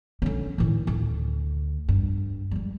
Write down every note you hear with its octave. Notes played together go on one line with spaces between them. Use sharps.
D3 C#4
A2 D#3
D2
G2
G3 G#3